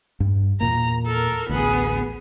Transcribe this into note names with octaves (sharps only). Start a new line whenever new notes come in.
G2
E2 A#2 A#3 A#5
A4 A#4
A1 D2 B3 G#4